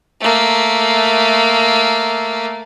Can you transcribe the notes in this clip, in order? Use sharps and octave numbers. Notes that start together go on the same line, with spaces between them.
A3 A#3